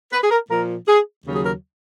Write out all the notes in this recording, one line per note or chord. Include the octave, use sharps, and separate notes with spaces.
B4
G#4
A#4
A#2 F3 A#4
G#4
D#2 C#3 F#3
G#4
A#4